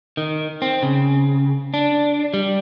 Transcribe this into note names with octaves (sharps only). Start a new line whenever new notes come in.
D#3
C4
C#3
D4
G3